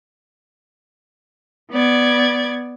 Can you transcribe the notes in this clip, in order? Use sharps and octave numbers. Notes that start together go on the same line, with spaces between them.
B3 D5 G#6